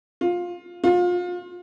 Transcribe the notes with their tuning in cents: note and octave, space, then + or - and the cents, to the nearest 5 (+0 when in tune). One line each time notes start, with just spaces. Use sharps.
F4 +15
F4 +30